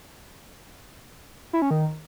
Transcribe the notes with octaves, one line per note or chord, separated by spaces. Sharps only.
E4
C#4
D#3